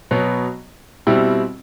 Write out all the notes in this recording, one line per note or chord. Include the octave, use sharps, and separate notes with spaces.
B2 F#3 B3
B2 G3 C4 E4